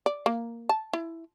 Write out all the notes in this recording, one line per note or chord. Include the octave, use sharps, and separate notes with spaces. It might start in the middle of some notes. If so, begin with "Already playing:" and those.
D5
A#3
A5
E4